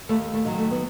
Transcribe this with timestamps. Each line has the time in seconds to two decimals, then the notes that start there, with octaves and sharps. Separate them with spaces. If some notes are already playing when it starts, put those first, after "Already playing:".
0.09 D#2 A3
0.34 A3
0.45 D#3 F#3
0.52 G#3
0.58 A3
0.71 B3